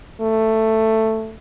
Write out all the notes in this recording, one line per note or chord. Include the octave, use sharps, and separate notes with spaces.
A3